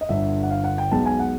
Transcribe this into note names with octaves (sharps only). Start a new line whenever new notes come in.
D#5
G1 G2 D3 E5
F#5
F5
F#5
G5
B1 B2 G#3 B3 A5
G#5
F#5